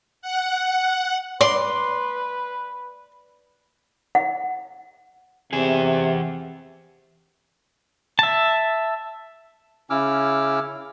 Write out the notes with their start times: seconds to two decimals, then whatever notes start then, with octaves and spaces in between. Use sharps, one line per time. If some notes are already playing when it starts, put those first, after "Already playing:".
0.22 F#5
1.41 B4 D5 C6
4.15 F#5
5.53 C3 E3 G#4
8.19 E5 A5
9.90 C#3 C#4 E4 D6 E6 F6